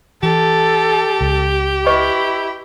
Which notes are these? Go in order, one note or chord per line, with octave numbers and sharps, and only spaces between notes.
E3 G4 A4
C#2
E4 B4 D#5 C#6